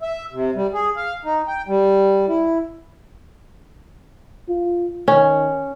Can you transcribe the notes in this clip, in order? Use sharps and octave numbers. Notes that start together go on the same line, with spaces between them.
E5
C3
G3
G#4
F5
D#4
G5
G3
E4
F4
D#3 C#4